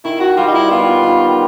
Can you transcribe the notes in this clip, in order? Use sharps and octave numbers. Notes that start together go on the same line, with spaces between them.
D#3 E4
F#4
G3 F4
D#4
E4
B3 F4
D#3